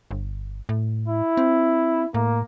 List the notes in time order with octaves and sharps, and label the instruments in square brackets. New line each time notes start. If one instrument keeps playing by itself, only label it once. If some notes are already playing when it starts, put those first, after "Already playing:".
[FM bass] G1
A2
[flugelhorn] E4
[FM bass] C4
[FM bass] A2 [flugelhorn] A#3